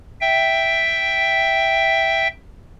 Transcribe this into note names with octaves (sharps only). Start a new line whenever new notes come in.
E5 G5